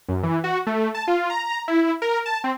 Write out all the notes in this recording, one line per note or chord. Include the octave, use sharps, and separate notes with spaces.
F#2
E3
F#4
A3
A5
F4
A#5
E4
A#4
A5
C4